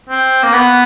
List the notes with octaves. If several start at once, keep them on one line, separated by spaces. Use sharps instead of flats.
C4
A#3
B3